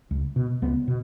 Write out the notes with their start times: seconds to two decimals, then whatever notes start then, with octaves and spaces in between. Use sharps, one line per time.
0.11 C#2
0.36 B2
0.62 C#2 B3
0.88 B2